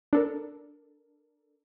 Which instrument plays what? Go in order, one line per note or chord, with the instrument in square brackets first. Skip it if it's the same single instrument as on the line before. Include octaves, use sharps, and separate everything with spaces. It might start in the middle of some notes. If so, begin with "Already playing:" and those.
[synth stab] D4 A4 A#4